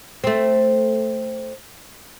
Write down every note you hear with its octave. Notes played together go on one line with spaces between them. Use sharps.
A3 C4